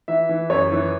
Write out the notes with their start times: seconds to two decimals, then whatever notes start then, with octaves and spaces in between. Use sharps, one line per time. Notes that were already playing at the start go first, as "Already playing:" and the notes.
0.08 E3 E5
0.29 E3
0.50 F#2 C#5
0.72 E3